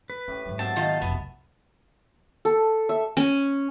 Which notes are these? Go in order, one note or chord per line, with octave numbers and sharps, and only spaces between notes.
B4
A2 C#4 G4
G#2 F#3
B2 C4 E5 F#5 A5
D#3 D#4 F4 A#5
F1 B1 B3 B5
A4
E5
C#4